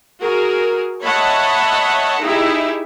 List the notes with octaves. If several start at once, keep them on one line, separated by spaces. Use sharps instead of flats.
F#4 G#4 A#4
C#5 D#5 E5 F#5 A5 B5
D#4 E4 G4 G#4 E5